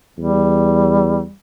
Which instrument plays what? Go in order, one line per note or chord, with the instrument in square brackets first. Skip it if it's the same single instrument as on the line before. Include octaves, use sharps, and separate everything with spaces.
[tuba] E2 [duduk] G3